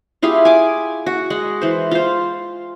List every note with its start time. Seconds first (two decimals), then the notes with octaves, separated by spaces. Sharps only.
0.22 E4 F4 G4 G#4
0.45 G#5 D6
1.06 F#4
1.30 G#3 F#5
1.61 E3 C5
1.91 F4 C5